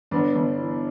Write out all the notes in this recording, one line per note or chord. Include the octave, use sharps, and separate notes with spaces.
G1 B3 D4
G1
E3